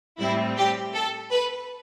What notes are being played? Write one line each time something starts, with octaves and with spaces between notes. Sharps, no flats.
A2 G3 C4 E4
G4
A4
B4